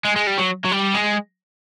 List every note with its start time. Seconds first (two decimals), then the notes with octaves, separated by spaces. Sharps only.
0.05 G#3
0.16 G#3
0.27 G3
0.38 F#3
0.64 F#3
0.71 G3
0.94 G#3